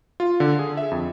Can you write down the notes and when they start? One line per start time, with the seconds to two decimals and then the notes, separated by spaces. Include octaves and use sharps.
0.20 F4
0.40 D3
0.59 G#4
0.77 E5
0.91 F2